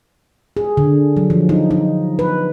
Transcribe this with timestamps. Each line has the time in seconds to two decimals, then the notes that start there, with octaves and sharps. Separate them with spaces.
0.57 G#4
0.77 D3
1.17 F#3
1.30 F3
1.49 D#4
1.71 D#4
2.19 B4